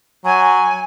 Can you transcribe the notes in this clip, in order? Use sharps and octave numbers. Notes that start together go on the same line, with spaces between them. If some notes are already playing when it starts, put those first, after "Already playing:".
F#3 G#5